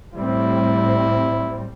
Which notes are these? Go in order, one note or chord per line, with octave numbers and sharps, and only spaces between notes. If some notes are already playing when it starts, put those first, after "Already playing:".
A2 G3 C4 E4